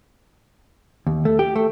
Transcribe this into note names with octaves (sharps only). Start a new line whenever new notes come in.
D#2
A3
G4
A3